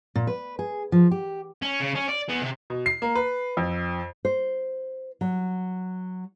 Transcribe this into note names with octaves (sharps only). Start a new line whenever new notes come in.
A#2
B4
G#4
F3
G4
C#4
C#3
C#4
D5
B3 G#4
C3
B2
C7
A#3
B4
F2
C5
F#3